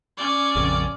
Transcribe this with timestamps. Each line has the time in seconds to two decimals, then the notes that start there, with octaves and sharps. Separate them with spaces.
0.18 C#4 D5
0.56 A#1 F2 C#3